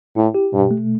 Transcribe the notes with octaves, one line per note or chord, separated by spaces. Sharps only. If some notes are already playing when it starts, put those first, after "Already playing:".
A2 E4
G4
G2 B2
A3